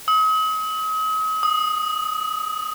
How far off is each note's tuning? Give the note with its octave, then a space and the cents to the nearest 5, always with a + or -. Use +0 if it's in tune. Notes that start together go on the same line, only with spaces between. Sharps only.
D#6 +40
D#6 -5